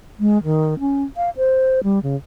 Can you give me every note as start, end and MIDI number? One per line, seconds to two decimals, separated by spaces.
0.20 0.42 56
0.44 0.78 51
0.80 1.04 61
1.17 1.30 77
1.37 1.83 72
1.84 2.02 55
2.03 2.16 49